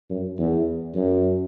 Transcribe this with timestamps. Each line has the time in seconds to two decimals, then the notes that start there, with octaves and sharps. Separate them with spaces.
0.10 F#2
0.38 E2
0.95 F#2